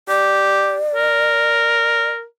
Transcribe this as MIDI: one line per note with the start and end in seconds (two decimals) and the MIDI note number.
0.09 0.78 67
0.09 2.10 74
0.95 2.24 70